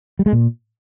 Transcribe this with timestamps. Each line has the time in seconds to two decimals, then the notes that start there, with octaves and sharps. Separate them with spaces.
0.19 G3
0.26 G#3
0.33 A#2